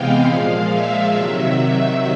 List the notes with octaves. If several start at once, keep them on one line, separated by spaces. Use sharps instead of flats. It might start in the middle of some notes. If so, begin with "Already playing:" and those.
Already playing: C3 E3 G#3 B3 F5 G5
A#2 F3 G#3
E5
C3 D#3 F#3